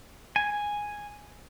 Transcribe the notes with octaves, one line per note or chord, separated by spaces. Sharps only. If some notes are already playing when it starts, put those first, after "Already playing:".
G#5